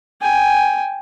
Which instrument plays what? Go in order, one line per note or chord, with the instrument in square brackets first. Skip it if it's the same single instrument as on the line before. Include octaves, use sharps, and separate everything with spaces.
[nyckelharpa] G5 G#5